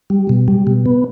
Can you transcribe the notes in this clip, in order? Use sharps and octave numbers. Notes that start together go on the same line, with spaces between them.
G3
B2
G3
B2
B3